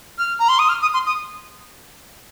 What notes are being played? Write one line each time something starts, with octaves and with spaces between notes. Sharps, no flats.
F6
A#5
C6
D#6
F6
D#6
C6
D#6